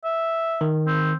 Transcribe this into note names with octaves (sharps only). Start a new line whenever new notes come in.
E5
D#3
C4